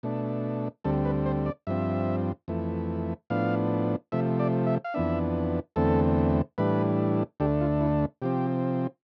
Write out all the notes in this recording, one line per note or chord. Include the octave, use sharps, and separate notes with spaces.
B2 A3 D4
D2 D3 G3 C4 A4
B4
C5
D5
G2 F3 C4 E5
F2 E3 A3
A2 F3 B3 D4 F5
C3 F3 A3 E5
D5
E5
F5
F2 E3 B3 D4 E5
E2 D3 A3 C4 A4
A2 E3 G3 D4 B4
D2 D3 A3 D4 G4
F4
E4
C3 F3 C4 G4